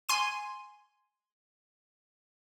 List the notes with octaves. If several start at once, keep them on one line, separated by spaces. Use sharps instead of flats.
G#5 C6 D#7